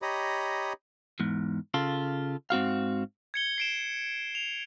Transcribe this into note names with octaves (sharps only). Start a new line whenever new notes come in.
G4 C#5 D#5 A#5 B5 D#6
E2 G#2
C#3 F4 A4
G#2 C4 F#4 F5
G#6 C#7 G7
C7 D7 E7
F7